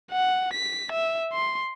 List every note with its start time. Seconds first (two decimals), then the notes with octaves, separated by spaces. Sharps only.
0.12 F#5
0.53 B6
0.92 E5
1.33 C6